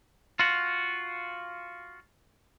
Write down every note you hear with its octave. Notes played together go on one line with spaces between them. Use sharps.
F4 F#4